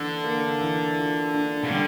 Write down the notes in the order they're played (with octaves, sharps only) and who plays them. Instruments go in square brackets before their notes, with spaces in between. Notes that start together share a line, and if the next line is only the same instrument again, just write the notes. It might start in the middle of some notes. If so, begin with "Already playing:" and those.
Already playing: [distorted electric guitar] D3 [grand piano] E3 D4
[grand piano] A#3
E3
F4
D4
[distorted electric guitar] C#3
[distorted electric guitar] D3 [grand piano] G3